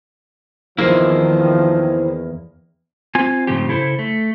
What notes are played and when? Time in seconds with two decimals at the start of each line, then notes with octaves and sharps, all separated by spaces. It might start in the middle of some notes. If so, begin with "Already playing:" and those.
0.79 E2 D#3 F3 A#3 E4 G#4 C5
3.15 C4 F4 G#5
3.47 G#2 C#3 F3 A3 C4 G4
3.68 C#3 E4 A4 C5
3.99 A3